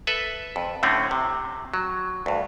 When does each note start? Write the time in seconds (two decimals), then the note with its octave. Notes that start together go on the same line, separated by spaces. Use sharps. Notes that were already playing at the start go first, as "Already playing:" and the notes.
0.07 A4 B4 E5
0.56 F2
0.83 A2 D3 A3 C4 C#4
1.11 C3
1.74 F#3
2.26 D2 G2